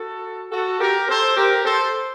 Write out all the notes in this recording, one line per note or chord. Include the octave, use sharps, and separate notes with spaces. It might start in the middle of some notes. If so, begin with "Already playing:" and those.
Already playing: F#4 A4
F#4 A4
G4 A#4
A4 C5
G4 A#4
A4 C5